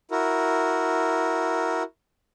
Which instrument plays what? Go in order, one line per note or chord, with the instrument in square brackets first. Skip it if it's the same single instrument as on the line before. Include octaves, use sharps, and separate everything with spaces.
[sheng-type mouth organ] E4 F#4 A#4